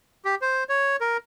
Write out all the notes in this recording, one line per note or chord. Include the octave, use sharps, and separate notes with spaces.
G4
C5
C#5
A#4